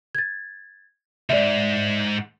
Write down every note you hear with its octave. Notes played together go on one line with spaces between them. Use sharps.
G#6 A6
D2 G#2 D5 E5